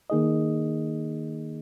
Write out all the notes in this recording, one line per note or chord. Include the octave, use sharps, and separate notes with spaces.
D#3 A#3 D#4 G#4 D#5